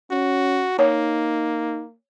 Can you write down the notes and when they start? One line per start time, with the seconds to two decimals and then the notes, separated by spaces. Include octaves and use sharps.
0.11 C#4 F#4
0.79 A#3 D#4 C#5